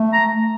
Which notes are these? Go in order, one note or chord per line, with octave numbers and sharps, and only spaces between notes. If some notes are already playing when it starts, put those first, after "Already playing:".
Already playing: A3
A#5